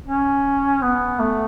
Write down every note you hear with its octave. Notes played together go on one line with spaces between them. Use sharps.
C#4
B3
A3